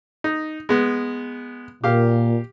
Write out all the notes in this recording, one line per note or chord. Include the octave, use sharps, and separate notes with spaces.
D#4
G#3 B3
A#2 G4 F5